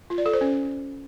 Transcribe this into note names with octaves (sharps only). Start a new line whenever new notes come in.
F4
D5
A4
C5
C#4